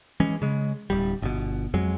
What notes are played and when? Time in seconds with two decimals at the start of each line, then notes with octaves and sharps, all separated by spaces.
0.20 E3 G#3 C#4
0.42 C#3 G#3
0.90 D1 G3
1.22 G1 B2
1.74 F2 F#3 G#3